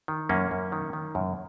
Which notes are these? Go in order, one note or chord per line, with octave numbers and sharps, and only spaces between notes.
D#3
F#2 A#3 C#4
F#2
D#3
D#3
F#2